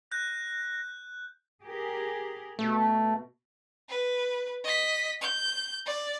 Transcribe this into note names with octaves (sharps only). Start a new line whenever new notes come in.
F#6 G6 A#6
G4 G#4 A#4
B2 A3
B4
D#5 B6
G6
D5